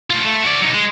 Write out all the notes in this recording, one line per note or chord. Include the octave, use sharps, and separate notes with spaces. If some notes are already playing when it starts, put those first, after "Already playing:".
A3 F4
A3
F#4 D5
F#3 D#4
G#3